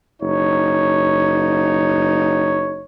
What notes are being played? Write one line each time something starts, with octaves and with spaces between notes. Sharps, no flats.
F#1 D#4 C#5